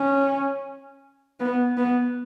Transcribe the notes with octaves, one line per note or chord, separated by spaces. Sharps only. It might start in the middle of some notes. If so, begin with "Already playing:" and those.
Already playing: C#4
B3
B3